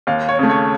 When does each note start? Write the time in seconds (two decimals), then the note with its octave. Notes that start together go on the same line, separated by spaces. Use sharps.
0.07 D#2 F5
0.29 C#5
0.39 C#3 A3
0.49 C#5